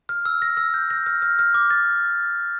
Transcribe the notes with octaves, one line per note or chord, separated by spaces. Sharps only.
F6
E6
A#6
E6
G6
A#6
F6
F6
F6
D6
A6